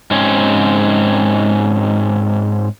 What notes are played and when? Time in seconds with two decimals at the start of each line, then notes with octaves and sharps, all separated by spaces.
0.11 G#2 C4 C#4